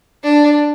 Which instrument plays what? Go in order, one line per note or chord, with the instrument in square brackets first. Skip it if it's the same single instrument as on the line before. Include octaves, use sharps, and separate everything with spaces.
[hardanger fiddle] D4